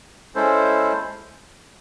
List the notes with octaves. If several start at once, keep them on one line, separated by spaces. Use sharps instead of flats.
G#3 C#4 E4 A4 C5